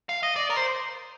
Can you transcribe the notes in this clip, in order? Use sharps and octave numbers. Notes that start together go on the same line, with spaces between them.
F5
D#5
D5
A#4
C5